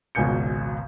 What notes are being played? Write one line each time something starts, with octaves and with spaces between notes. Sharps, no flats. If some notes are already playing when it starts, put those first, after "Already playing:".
G#1 C#2 B2 G#5 G6 C#7